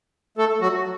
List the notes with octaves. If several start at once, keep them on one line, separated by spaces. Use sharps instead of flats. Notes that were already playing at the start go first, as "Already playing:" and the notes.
A3 A4
F#3 F#4